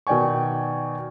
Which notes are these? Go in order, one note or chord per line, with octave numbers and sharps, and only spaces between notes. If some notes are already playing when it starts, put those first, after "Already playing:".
B2 D#3 D5 G5 G#5 C#6